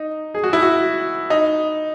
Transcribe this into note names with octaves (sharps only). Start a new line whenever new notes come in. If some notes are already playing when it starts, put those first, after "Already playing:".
Already playing: D#4
G#4
F#4
E4
F#4
D#4